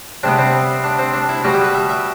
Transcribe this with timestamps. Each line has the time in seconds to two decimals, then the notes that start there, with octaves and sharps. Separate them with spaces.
0.23 C3 G3 B3 D4
0.38 C4
0.84 D4
0.99 C4
1.13 D4
1.29 E4
1.44 B2 G3 B3 F#4
1.54 G4
1.64 B4
1.74 E5
1.89 E5